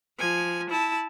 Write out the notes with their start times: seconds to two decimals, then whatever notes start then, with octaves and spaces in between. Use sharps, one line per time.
0.18 F3 G#5
0.70 E4 A5